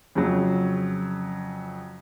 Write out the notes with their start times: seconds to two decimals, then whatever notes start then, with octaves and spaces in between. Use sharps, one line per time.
0.15 F2 C#3 F#3